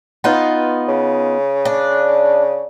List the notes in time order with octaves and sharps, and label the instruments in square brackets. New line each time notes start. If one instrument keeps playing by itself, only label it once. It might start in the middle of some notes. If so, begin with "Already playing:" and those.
[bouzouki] B3 D#4 F4
[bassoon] C#3
[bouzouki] D4